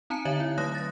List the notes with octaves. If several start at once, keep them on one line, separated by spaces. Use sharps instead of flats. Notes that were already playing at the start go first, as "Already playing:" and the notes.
C4 D#4 A5 A#5 C#7
D3 C#5 D#5 E5 F#6
E4
F#3 A3 C#5 D#6 F#6 A#6
A6 A#6